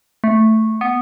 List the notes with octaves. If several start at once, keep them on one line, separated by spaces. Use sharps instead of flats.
A3
B3